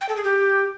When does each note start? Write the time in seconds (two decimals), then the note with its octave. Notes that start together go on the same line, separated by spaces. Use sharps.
0.01 G5
0.09 A4
0.16 G#4
0.24 G4